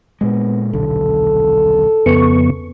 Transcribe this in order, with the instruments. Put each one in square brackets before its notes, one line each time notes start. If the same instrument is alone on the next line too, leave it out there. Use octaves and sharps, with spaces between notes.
[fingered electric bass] A#2 G#3 [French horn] B3
[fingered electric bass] D#1 B1 D3 [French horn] A4
[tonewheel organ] F2 B3 C#6 [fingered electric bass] C#3